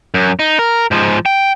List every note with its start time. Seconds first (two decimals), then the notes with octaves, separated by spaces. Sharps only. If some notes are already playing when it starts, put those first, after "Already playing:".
0.14 F#2
0.39 D#4
0.59 A#4
0.91 G#2 F3
1.26 G5